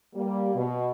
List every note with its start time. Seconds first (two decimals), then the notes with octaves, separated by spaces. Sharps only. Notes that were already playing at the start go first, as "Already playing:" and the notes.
0.15 G3 A#3
0.55 B2